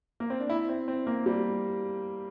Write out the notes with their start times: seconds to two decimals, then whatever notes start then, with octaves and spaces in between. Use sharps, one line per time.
0.20 A#3
0.30 C4
0.40 D4
0.50 E4
0.69 C4
0.88 C4
1.07 A#3
1.26 G3